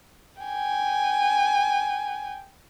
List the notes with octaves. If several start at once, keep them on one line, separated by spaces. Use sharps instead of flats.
G5 G#5